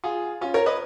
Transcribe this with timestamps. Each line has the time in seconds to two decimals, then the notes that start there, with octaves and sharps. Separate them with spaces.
0.04 F4 G#4
0.41 C#4 F4
0.54 A#4 C#5
0.66 B4 D#5